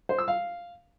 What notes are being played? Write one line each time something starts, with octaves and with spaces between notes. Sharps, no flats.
C5
E6
F5